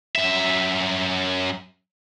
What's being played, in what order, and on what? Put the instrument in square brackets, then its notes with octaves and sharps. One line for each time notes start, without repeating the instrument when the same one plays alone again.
[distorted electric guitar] F#2 E5